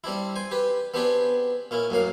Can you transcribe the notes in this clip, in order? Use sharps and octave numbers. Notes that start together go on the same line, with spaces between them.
G3 C4 D4 E4
C5 G#5
G4 B4
B3 C4 D4 G4 G#4 B4
A#2 C#4 E4
F#2 A2 A#3 F5